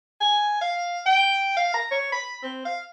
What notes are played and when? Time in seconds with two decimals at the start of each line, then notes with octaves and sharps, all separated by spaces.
0.20 G#5
0.61 F5
1.06 G5
1.57 F5
1.74 A#5
1.91 C#5
2.12 B5
2.43 C4
2.65 F5